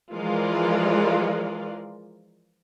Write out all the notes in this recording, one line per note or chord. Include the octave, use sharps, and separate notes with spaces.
E3 F3 G#3 F4 A#4 D5